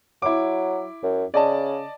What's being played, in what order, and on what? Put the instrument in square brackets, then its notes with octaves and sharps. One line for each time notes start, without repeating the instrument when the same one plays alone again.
[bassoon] F#3 [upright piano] E4 D6
[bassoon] F#2
[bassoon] C#3 [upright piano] D5 D#5 A5